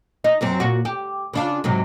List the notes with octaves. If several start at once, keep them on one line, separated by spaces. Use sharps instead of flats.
D#4
F#2 F#3 C4
A#2 F#4
G4
C#3 D4 F4
G#2 C3 F#3